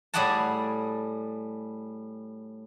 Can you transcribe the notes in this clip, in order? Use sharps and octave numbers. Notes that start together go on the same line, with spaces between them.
A2 G3 G#4 D5 F#5 A5